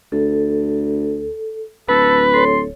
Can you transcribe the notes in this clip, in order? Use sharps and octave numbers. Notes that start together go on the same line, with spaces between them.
D2 A4
D1 A4 B4
A4 C#5 C6